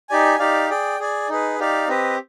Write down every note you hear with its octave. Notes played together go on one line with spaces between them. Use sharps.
D#4 G4 D5 G#5
D#4 G4 D5 F5
G#4 D5 G5
G#4 D5 G#5
D#4 G#4 B4
D#4 G4 D5 F5
C4 G4 B4 D#5